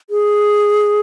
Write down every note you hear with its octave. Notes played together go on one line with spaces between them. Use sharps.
G#4